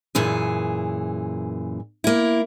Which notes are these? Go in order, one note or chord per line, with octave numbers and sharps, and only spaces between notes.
F#2 A#2 E3 G#4
A#3 E4